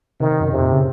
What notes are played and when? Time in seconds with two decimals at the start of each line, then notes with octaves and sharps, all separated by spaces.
0.20 C3 D#3
0.31 C3
0.40 F#2
0.52 F2 C3
0.62 A#2
0.72 C#3